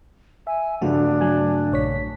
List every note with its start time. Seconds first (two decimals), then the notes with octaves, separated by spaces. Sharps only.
0.47 E5 G#5
0.82 G2 C#3 F3 A3 D4 F#4
1.21 F#3 G#5
1.72 A#1 C#5 B6